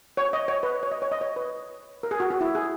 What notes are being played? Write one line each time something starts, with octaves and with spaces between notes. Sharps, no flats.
C#5
D#5
C#5
B4
C#5
D#5
C#5
D#5
C#5
B4
A#4
G#4
F#4
F#4
E4
G#4